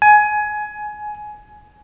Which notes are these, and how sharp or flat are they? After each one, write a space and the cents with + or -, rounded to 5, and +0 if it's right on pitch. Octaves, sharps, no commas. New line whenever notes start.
G#5 +20